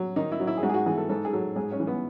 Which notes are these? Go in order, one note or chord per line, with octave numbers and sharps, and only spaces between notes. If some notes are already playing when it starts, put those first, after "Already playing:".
Already playing: F#3
D#3 D#4
E4
F#3
E4
G#4
G#2 F#4
G#4
F#4
E3 G#4
A4
G#2 A4
G#4
F#3 A4
G#2 G#4
C#4
E3
B3